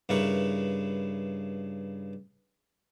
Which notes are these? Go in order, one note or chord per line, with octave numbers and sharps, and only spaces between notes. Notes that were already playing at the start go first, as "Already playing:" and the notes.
G2 C#3 E4 A#4 B4 C#6